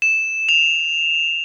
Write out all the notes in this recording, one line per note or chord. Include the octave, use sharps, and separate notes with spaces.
E7
F7